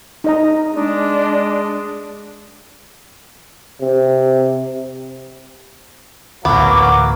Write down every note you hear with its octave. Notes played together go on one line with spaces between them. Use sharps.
D#4 D#5 A#5
G#3 D4
C3
A1 D2 F#3 A#3 B3 D6